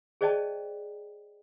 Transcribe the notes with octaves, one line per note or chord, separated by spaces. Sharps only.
G#4 C5 D5 D#5 G5 A5